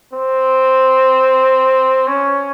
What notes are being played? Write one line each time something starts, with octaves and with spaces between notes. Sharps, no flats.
C4
C#4